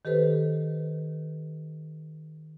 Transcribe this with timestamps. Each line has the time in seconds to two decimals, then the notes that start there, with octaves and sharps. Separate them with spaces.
0.05 D#3 G4 A4 B4 C5